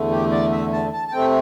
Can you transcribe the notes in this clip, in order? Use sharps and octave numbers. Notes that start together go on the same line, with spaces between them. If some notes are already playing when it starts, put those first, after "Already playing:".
Already playing: E2 D3 A3
G4
D5
E5
A5
A5
A5
C3 A3 C4 G5